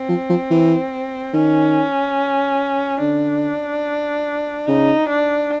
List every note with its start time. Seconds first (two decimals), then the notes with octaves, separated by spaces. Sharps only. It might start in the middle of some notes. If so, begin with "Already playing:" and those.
Already playing: C4
0.09 F3
0.30 F3
0.50 E3
1.34 D#3 C#4
3.00 D3 D4
4.68 C#3 D#4
5.09 D4